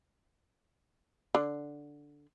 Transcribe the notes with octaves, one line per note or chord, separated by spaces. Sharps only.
D3